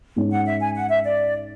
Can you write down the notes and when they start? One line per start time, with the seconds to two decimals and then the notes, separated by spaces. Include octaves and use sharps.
0.16 G#2 G#3 C#4
0.31 F#5
0.45 E5
0.60 G#5
0.75 F#5
0.90 E5
1.04 D5